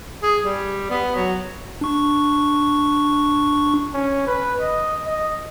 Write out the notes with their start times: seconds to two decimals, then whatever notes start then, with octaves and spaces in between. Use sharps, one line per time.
0.23 G#4
0.45 G3
0.91 B3
1.15 F#3
1.81 D4 C#6
3.94 C#4
4.27 B4
4.60 D#5
5.06 D#5